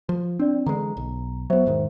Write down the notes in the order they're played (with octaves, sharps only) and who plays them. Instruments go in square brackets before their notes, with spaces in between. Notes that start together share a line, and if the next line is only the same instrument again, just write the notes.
[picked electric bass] F3
[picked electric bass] C4 [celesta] D4 D5
[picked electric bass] D3 E3 G#3 [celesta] A#5
[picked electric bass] B1
[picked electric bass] F#3 B3 [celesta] C5 E5
[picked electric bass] E1 G#2 D#3